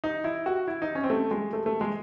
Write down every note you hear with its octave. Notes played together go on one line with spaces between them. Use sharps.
D#4
E4
F#4
E4
D#4
C#4
C4
A3
G#3
A3
A3
G#3